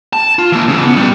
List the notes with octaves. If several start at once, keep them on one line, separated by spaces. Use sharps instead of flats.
A5
F4
E3 A#3
C#3 E3
B3
A#2 G3